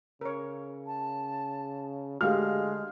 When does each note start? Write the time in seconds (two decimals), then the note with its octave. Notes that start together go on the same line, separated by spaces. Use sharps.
0.21 C#3 A#4 C#5
0.87 A5
2.21 D3 G#3 A3 F#4 G4 F5 F6